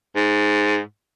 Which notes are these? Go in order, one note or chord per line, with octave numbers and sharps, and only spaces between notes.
G#2